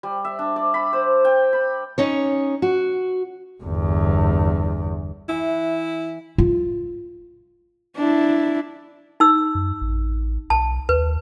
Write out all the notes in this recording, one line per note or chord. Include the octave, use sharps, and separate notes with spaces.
G3
E5
D4
D5
B5
C5
G5
B5
C#4 D#4 C#5
F#4
G1 E2
E3 E4
F4
D4 E4
D#4 E6
F#2
A1
B1 A5
D#2 B4